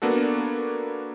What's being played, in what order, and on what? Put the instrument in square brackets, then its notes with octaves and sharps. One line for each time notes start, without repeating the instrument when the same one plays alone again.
[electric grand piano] A#3 B3 D4 F#4 A4